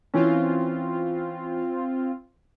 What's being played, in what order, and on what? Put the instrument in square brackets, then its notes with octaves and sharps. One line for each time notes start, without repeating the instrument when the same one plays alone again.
[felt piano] E3 C#4 [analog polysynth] C4 F4